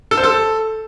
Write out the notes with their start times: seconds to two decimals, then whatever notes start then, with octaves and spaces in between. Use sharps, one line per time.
0.11 A4
0.17 C5
0.24 A4